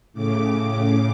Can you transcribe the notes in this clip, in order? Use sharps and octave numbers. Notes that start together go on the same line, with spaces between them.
A2 C#3 D6